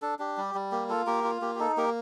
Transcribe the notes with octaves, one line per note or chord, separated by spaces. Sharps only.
D4 A4
D4 G4
G3
G3
A#3 G4
F4 A4
A#3 G4 A#4
F4
A#3 G4
G4
D#4 A4
A#3 G4 A#4